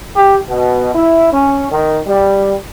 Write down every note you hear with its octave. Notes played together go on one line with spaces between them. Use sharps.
G4
B2
E4
C#4
D#3
G3